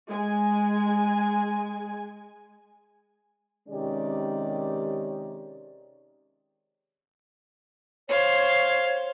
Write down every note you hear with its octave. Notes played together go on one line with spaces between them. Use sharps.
G#3 G#5
C3 D#3 G#3 C#4 G4 D5
C5 C#5 F5